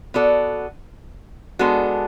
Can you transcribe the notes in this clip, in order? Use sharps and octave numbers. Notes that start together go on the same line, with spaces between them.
B3 F#4 A4 D5
G#3 B3 D4 F#4 A4